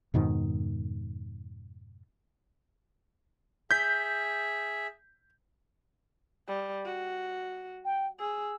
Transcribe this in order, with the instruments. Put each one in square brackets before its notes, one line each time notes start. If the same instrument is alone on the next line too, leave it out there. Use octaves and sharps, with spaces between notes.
[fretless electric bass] F2 G#2 B2 D#3
[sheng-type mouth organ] G#4 E5 [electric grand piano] G6 B6
[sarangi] G3
F#4
[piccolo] G5
[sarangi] G#4 [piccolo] E6